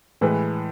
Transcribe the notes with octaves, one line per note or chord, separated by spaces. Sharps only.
A2 E3 G#3 B4